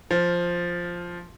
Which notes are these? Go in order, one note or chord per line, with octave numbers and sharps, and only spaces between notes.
F3